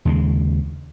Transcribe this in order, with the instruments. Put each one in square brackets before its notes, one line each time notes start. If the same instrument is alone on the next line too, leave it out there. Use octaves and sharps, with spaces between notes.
[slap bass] D#2 C#3 G#3